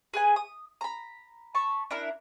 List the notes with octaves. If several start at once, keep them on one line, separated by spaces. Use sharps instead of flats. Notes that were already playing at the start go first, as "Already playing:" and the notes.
G#4 B4 G#5
D#6
A#5 B5
A5 B5 C#6
D4 E4 A#4